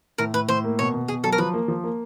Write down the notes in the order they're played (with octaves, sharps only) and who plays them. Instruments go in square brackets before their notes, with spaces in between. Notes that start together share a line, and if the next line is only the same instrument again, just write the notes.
[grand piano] A2 [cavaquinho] A#4
[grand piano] A2 [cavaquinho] B4
[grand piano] A2 [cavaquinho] C5
[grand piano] A#3
[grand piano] B2 [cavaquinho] C#5
[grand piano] B2
[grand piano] B2 [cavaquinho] G#4
[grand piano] F#3 [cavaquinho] A4
[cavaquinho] A#4
[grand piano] F3 [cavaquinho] B4
[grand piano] A#3
F3
A#3